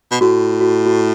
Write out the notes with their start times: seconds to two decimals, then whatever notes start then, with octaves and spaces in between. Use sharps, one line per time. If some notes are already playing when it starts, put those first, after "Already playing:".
0.11 B2
0.21 A2 F#4
0.61 F#4
0.86 F#4